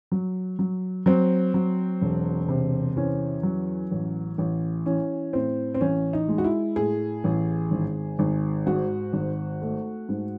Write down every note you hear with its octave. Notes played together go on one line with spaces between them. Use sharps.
F#3
F#3
F#3 C4
F#3
E1
C3
E2 C#4
F#3
A1
A1
E3 C#4
A2 C4
C4
A1 C#4
D#4
G#3
F#4
E4
A2 G#4
A1
G#1
G#1
G#2 F#4
G#1
A3
G#2